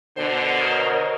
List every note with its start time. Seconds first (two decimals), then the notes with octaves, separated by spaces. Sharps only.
0.17 B2 D3 C5
0.61 A#4 C#5 D#5